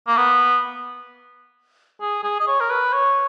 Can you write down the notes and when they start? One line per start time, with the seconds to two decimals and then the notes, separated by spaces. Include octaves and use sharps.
0.08 A#3
0.17 B3
2.01 G#4
2.24 G#4
2.40 D#5
2.47 C#5
2.60 A#4
2.70 B4
2.93 C#5